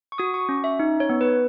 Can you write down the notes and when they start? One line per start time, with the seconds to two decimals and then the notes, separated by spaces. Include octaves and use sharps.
0.12 C#6
0.18 F#4 D#6
0.34 C#6
0.49 C#4
0.64 E5
0.80 D#4
1.00 C#5
1.09 B3
1.21 B4